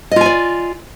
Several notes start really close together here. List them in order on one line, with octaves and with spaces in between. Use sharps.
D#5 F4 G#5 D5